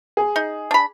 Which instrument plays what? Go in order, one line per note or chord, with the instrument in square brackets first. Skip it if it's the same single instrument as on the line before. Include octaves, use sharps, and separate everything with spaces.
[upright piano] G#4
[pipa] D#4
D4 B5